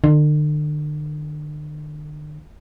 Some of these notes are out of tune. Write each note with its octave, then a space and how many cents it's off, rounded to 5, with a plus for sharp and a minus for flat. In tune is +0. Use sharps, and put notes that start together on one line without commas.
D3 +40